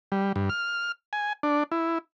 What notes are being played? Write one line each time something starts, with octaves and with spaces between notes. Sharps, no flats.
G3
G2
F6
G#5
D4
E4